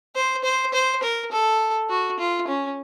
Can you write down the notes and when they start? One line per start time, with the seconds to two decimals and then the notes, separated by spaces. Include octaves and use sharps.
0.15 C5
0.44 C5
0.74 C5
1.03 A#4
1.32 A4
1.90 F#4
2.19 F4
2.48 C#4